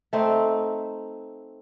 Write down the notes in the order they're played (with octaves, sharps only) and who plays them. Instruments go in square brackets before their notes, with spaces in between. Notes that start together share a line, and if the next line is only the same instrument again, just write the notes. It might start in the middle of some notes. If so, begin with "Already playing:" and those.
[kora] A3 C4 D#4